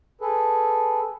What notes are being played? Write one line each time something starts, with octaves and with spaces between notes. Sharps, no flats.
G#4 A4 B4